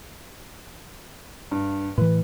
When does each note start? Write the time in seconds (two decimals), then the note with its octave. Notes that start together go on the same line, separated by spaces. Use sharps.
1.51 G2
1.98 A2 E3 B4